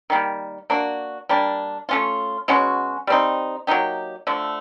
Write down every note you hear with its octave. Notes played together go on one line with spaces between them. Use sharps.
D#3 G3 A#3
A#3 D4 F#4
G3 A#3 D4
A3 C#4 F4
B2 G#3 C#4 F#4
G3 C4 D#4
F#3 A#3 D#4 G4
D3 F3 A3